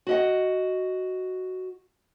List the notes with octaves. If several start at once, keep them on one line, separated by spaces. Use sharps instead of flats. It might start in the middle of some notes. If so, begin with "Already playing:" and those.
F#4 D#5 F#5